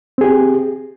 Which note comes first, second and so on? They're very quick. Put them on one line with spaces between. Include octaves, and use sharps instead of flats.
C4 G#4 G4